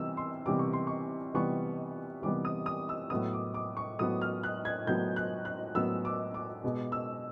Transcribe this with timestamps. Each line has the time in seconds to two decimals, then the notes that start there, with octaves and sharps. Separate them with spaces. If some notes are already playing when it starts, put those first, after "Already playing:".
Already playing: C3 E3 G3 B3 E6
0.17 C6
0.46 C3 E3 G3 B3 D6
0.59 C#6
0.73 C6
0.87 C#6
1.34 C3 E3 G3 B3 C#6
2.22 C3 E3 G3 B3 D6
2.45 D#6
2.66 D#6
2.89 E6
3.10 A2 F#3 B3 D#6
3.33 D6
3.54 D6
3.77 C#6
3.99 A2 F#3 B3 D#6
4.21 F6
4.43 F#6
4.65 G#6
4.87 A2 F#3 B3 G6
5.16 F#6
5.45 F#6
5.75 A2 F#3 B3 E6
6.05 D6
6.34 D6
6.64 B2 G#3 B3
6.92 E6